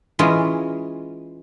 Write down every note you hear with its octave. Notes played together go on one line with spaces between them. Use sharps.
E3 G#3 C#4 F4 D#5